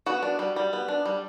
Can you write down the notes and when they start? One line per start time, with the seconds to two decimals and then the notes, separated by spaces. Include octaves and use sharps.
0.06 B3 F#4
0.23 D4
0.39 G3
0.56 G3
0.73 B3
0.88 D4
1.05 G3